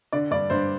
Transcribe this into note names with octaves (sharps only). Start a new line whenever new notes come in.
D3 D5
G2 D5
G2 C5